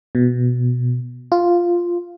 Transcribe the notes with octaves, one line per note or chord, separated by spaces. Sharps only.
B2
F4